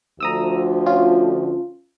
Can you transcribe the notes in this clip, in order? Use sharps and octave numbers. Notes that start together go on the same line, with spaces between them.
D2 F3 F#4 A#5 D#6 E6
C#4 F4